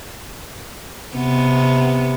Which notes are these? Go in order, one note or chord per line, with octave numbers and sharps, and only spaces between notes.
C3 B3